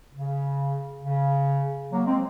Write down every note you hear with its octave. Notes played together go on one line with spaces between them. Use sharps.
C#3
C#3
F#3 A#3
G#3 C4